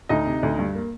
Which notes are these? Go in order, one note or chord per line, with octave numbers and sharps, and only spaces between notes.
D2 D#4 D#5
C3
D2
G2
A#3